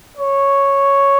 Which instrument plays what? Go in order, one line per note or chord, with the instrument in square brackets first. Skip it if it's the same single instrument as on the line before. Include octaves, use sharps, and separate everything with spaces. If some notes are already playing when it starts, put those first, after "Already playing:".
[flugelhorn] C#5